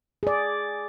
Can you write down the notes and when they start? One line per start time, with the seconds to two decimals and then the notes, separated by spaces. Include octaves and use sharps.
0.23 G#4 D5